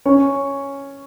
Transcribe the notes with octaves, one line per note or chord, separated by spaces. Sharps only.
C#4 C#5